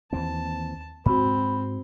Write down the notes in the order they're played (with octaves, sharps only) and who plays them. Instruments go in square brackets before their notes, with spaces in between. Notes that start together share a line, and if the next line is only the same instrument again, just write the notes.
[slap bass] D#2 E3 C4 [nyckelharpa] A5
[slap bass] G#2 [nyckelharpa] C4 [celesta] F#4 B5